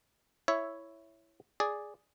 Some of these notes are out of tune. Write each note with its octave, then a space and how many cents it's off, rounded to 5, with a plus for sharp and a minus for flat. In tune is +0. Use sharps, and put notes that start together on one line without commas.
E4 +5 C#5 +0 E5 +0
G#4 +0 D5 +0